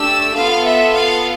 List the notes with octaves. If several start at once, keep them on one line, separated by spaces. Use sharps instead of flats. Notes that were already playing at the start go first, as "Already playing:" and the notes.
Already playing: A3 D4 G4 E6
B3 F4 A4 F5
E5
F5